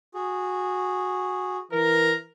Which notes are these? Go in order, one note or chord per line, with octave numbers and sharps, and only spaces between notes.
F#4 G#4
E3 A#4